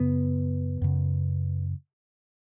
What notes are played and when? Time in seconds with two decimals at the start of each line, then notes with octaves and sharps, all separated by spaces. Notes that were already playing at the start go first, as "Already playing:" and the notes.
Already playing: F#2 C#3 B3
0.82 F#2 C#3